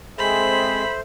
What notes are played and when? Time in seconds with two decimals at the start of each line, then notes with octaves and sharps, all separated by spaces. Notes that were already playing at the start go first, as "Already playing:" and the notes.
0.18 G#3 C4 G#4 A4 C5 E5 B5